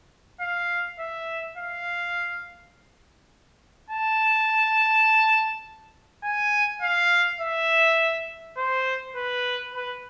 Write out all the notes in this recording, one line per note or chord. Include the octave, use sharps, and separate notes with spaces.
F5
E5
F5
A5
G#5
F5
E5
C5
B4
B4